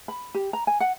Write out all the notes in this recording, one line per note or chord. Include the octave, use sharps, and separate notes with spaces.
B5
G4
A#5
G#5
F#5